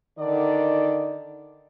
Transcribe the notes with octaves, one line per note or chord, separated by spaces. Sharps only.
D3 D#3 D5